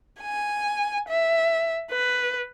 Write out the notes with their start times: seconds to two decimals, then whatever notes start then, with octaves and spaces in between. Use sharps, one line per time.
0.20 G#5
1.08 E5
1.91 B4